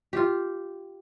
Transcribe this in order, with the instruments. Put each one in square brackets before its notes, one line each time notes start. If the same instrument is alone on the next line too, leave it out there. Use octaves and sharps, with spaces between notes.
[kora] F4 G4